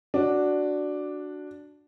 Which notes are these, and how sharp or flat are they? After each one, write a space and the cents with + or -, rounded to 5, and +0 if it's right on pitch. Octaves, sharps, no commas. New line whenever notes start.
D4 +0 F#4 +0